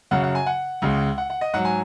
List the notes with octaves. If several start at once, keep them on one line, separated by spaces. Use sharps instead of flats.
F#2 C#3 F#3 F#5
F#5
G#5
F#5
C#2 C#3 G#3
F#5
F#5
D#5
G#2 F#3 F#5
G#5